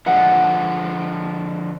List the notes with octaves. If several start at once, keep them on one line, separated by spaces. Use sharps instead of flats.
D3 F3 G#3 F#5